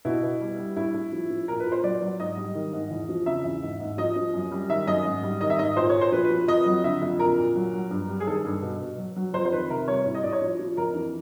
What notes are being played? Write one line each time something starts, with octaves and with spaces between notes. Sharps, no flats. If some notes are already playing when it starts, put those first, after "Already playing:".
B2 E4
B2
G3
G3
A2 E4
A2
F3
F3
A#2 A#4
B4
A#2
C5
F#3 D5
F#3
G#2 D#5
G3
D#3
G#2
E2
F3
C#3 E5
E2
G#2
G#2
F3 D#5
F3
F#2
G3
D#3 E5
F#2 D#5
G#2
G3
D#3 D#5
E5
G#2 D#5
A#2 C5
C#5
A#2
C5
F3 B4
B4
F3
F2 D#5
F#3
D3 E5
F2
A#2 A#4
A#2
F#3
F#3
G2
G3
G#4
D#3 A4
G2
B2
B2
F#3
F#3
F2 C5
C5
D#3 B4
C3 A#4
G3 C#5
A2
D#5
A2 D5
C#5
F3
F3
F2 A#4
E3